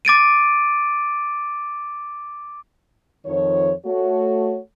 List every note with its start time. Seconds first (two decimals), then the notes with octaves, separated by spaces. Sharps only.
0.05 D6 A6 D7 D#7
3.26 F2 D#3 F3 C#5
3.86 A3 F#4 C#5